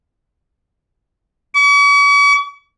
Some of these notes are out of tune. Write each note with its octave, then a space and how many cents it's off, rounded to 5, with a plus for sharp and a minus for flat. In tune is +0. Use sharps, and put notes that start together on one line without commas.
C#6 +45